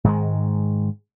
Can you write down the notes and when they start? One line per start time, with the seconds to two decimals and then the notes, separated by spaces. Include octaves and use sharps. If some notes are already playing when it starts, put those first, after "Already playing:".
0.04 G#2 D#3 G#3